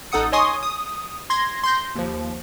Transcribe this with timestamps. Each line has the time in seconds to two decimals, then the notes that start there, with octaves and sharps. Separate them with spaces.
0.12 A1 D#4 A4 F#5 D#6 C#7
0.32 C#5 D#5 G#5 C6 C#6 D#6
0.63 D#6
1.30 C6 G#6 A#6
1.63 C6 G6 A#6
1.95 D#2 F3